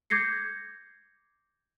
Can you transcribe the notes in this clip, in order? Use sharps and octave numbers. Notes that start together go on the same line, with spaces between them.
D6 G6 G#6 A#6 C7 C#7